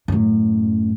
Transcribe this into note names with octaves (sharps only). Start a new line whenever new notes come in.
F#2 A2